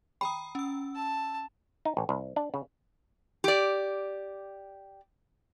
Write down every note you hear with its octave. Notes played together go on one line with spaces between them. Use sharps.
G5 A#5 B5 D#6
C#4 E6
A5
D#4
A1
C2
D4
C#3
G4 D5